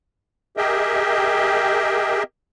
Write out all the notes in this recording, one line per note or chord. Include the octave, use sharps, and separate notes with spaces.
G4 G#4 A#4 D#5 E5 G5